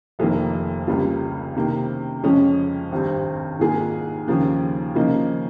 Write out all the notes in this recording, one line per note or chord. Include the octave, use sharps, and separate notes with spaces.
F1 F2 D#3 A#3
C#2 C#3 G3 A#3 F4
C3 D#3 A#3
F2 C#3 F3 G#3 C#4
G#1 G2 G3 C4
G#2 D#3 A#3 F4 G#4
D#2 C#3 F3 A#3
C#3 F3 A#3 D#4